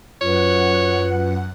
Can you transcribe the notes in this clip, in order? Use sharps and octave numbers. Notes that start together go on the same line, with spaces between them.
F#2 F4 B4 C#5 F#5